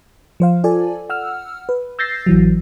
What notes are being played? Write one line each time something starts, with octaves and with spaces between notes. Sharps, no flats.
F3 C5 F5
F4 A4 D5 G#5
F#5 E6 F6
B4
E6 G6 A6 A#6 C7
A1 E3 F#3